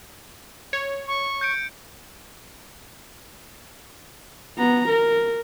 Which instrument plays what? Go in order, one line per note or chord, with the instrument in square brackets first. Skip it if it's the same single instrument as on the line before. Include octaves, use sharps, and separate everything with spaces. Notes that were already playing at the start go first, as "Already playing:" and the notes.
[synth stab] C#5
[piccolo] C#6
[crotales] G6 C#7 D7
[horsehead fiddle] B3 A#5
A#4